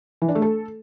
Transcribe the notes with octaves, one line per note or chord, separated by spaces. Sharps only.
E3
D4
A3
A4